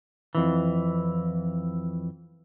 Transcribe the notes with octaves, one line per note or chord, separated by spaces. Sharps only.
F2 E3